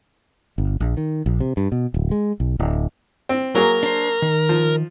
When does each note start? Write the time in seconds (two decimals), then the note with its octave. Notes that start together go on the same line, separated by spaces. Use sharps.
0.58 G1
0.80 A#1
0.97 D#3
1.26 A#1
1.40 C3
1.57 G2
1.72 B2
1.94 D1
2.11 G#3
2.40 B1
2.59 D1
3.29 C4
3.55 F#3 A#3 G#4 A#4
3.83 D4 C5
4.22 D#3
4.49 F3